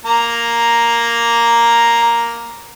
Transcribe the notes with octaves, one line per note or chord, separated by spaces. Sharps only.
A#3 A#5